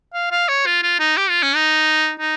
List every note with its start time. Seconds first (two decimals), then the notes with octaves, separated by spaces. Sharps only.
0.14 F5
0.31 F5
0.49 C#5
0.66 F4
0.83 F4
1.00 D#4
1.17 G4
1.29 F4
1.43 C#4
1.55 D#4
2.20 D#4